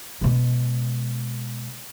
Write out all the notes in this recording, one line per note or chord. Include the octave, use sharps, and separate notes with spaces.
B2 G#3